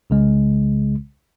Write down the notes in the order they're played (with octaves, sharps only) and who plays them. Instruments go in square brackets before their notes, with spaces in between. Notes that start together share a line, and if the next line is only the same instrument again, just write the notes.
[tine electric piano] C2 C#3 G#3